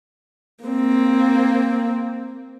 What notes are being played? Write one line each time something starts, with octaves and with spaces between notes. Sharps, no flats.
A#3 C4